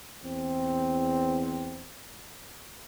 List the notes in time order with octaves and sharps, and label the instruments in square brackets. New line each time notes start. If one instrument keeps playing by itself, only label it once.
[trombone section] E2 C4